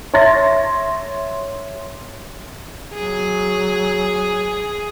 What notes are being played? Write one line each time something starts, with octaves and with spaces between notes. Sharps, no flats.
C#5 E5 C6 A6 A#6
F#3 G#4